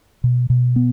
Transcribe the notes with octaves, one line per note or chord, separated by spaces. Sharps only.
B2
B2
B3